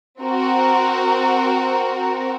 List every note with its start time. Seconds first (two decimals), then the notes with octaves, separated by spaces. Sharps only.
0.21 C4 F#4 A#4